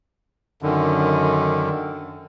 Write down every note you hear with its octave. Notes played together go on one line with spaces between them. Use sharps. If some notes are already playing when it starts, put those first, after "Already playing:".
F#2 D3 D#3